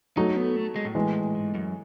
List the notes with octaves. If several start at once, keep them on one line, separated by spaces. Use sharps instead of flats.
F#3 A3 D#4
B3
A3
G#3
A2
E3 G#3
G#2
F#2